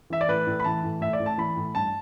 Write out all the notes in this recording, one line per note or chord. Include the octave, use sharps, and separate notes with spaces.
E3 E5
D5
A2 B4
A2
B5
E3 A5
A2
A2 E5
D5
A2
A5
E3 B5
A2
G2 A5